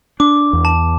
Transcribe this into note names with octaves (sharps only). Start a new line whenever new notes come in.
D4 D6
E2
A5